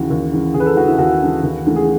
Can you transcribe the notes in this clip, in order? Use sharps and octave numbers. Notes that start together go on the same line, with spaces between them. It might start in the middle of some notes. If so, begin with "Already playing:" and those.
Already playing: D#2 C#3 E3 F#4
D#2
C#3 E3
D#2 G#4
B4
A4
C#3 E3 F#4
E4
D#2 F#4
C#3 E3
D#2
C#3 E3 A3
G#4